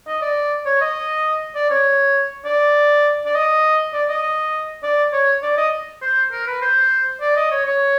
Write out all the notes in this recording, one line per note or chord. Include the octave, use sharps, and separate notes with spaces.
D#5
D5
C#5
D#5
D5
C#5
D5
D5
D#5
D5
D#5
D5
C#5
D5
D#5
C5
A#4
B4
C5
D5
D#5
C#5
C#5